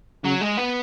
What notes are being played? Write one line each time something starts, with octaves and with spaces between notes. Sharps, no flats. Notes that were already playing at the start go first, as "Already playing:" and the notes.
C#3 F#3
G#3
B3